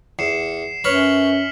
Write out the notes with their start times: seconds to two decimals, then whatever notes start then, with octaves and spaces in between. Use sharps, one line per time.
0.19 E2 C7 C#7 E7
0.84 F#2 B4 C#5 F6 B6 F#7